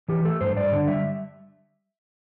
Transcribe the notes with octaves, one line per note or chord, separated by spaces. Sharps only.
E3 G4
A3 A4
G2 C5
G2 D5
D3
G3 E5